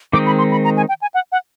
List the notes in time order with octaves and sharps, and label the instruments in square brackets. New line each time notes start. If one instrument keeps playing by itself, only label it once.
[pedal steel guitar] D#3 G#3 C4 D#4 [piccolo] D6
[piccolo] B5
C6
B5
A#5
G#5
G5
G#5
F#5
F#5